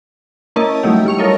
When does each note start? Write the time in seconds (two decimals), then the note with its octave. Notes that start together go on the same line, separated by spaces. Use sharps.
0.56 A#3 C#4 E4 D#5 A5
0.83 F#3 G3 A3 D#4 E4 G4
1.05 G3 E4 C#6 F7
1.18 F4 A4 A#4 C#5 D#5